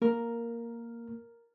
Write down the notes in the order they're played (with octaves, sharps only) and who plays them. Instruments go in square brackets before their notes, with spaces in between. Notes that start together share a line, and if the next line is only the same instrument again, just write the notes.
[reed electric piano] A#3 [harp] A#4